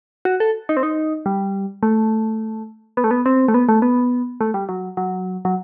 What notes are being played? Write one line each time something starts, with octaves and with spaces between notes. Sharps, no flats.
F#4
A4
D#4
C4
D#4
G3
A3
B3
A3
B3
C4
A3
B3
A3
B3
A3
G3
F#3
F#3
F#3